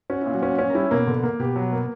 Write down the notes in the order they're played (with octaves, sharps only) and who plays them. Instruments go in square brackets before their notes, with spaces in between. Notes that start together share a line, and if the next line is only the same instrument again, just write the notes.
[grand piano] C#4 [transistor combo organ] F#4
[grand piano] A#2 [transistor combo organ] E4
[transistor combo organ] F#3 F#4
[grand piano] C#4
C#4
[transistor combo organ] A#4
[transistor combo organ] G3 G4 [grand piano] E4
[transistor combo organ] B2 B3 [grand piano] A#3
[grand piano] D3
A#3
[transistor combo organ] B2 B3 [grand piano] G4
[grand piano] F#3
A#3